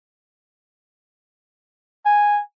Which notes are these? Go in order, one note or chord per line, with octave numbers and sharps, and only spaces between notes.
G#5